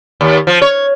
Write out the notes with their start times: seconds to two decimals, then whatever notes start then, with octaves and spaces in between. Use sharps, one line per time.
0.21 D#2
0.47 F3
0.62 C#5